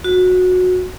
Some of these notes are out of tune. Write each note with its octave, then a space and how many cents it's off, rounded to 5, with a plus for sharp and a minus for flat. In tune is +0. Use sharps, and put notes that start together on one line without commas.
F#4 -20